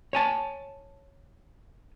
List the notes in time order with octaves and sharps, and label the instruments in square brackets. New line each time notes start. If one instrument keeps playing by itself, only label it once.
[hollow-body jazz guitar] C#5 G#5 A5